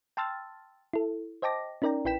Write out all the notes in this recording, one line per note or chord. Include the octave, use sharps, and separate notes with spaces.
G5 A5 C6 E6 F6 A6
E4 A4
C5 D#5 G5 A5 D6 A#6
C#4 D#4 A#4 D5 G5 A#5
A1 E4 B4 G5 B6 E7